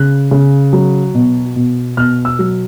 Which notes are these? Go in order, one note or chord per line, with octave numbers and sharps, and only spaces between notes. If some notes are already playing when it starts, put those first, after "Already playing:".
Already playing: C#3 F#6
C#3
F#3
B2
B2
B2 F6
E6
F#3